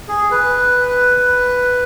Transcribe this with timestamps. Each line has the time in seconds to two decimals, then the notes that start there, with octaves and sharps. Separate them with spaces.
0.08 G#4
0.31 B4